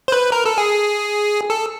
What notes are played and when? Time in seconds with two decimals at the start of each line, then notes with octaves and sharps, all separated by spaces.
0.08 C5
0.12 B4
0.32 A#4
0.46 A4
0.58 G#4
1.50 A4